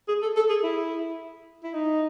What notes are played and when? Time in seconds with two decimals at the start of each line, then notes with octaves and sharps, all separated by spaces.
0.08 G#4
0.22 A4
0.36 A4
0.49 G#4
0.63 E4
1.63 E4
1.74 D#4